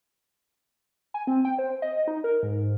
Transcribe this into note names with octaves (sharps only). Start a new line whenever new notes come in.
G#5
C4
G5
C5
D#5
D#4
A#4
G#2